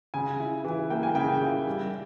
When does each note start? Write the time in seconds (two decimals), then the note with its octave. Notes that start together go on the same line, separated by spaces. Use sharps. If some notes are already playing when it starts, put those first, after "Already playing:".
0.14 C#3 G#5
0.40 E4
0.64 E3
0.90 A#3 G5
1.03 G#5
1.15 C#3 G5
1.41 E4
1.67 G3